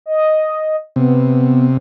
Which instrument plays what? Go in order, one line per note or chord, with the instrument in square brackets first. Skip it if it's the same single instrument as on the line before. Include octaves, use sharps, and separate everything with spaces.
[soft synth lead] D#5
[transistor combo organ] C3 [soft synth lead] B3